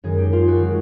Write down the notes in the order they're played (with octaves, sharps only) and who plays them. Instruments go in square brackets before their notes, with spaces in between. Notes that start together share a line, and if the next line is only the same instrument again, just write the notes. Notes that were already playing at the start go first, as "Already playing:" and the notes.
[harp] F#2 D#3 G#3 G#4
G4
F4
F#4
D#3 G#3